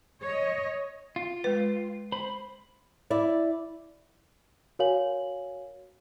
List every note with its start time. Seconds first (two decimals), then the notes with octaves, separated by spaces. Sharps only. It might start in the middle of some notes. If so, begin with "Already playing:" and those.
0.23 C#5 D#5
1.16 F4
1.44 G#3 B4
2.12 C5 B5
3.10 E4 D5
4.79 F#4 A#4 C#5 F5 G#5 F#7